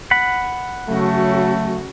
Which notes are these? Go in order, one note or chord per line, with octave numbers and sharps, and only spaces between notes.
F#5 B5
C#3 F#3 A3 F#4